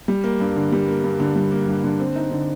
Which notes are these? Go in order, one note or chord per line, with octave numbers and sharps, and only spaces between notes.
G3
A#3
G2
D3
G3
A#3
G2
D3
G3
A#3
G2
D3
C4
D#4
D3